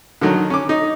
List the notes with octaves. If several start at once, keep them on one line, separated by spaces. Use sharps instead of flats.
D3 D#3 F#3
C#4 D6
D#4